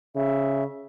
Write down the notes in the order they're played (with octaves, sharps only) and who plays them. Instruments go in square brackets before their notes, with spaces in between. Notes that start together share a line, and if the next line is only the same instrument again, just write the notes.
[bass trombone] C#3 [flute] E5